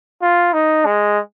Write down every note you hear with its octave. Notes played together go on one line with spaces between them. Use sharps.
F4
D#4
G#3